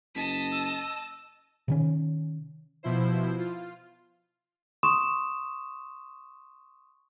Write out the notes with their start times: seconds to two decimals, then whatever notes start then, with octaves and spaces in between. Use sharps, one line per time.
0.15 F#1 D#5 A5 B6
0.52 E6
1.68 C3 D#3 C#4
2.83 B2 F3 E4 C5
3.38 F4
4.83 C6 C#6 D#6 E7